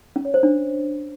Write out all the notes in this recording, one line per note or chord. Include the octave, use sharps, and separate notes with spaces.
C#4
C#5
C5
D4